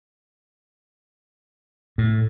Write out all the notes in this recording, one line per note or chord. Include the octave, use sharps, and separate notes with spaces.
A2